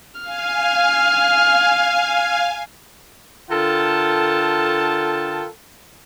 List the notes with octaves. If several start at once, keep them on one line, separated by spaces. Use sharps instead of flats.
F5 G#5 F6
D3 F4 A4 A#4 G5 A5